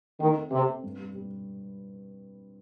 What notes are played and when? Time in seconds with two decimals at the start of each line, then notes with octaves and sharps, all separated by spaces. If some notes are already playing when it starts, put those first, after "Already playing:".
0.20 D#3 A3
0.36 C4
0.52 C3 C4
0.68 C4
0.84 G2
0.99 G3
1.15 G3